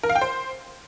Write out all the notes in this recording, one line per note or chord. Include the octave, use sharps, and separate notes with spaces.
A#4
F5
G5
C5